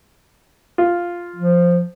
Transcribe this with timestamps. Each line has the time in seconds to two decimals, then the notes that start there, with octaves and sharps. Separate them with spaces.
0.78 F4
1.36 F3